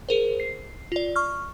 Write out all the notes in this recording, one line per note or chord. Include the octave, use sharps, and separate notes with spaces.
G#4 A#4 C5
C7
F4 D5
C#6 F6